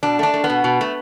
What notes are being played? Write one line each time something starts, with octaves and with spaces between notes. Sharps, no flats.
B2 D4
A3 D4
A3
B3
B2
B2
A3